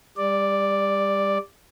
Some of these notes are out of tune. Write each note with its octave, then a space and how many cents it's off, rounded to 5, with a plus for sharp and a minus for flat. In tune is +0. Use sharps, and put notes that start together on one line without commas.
G3 +30 D5 +0